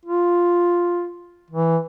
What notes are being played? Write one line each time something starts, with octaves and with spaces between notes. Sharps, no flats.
F4
E3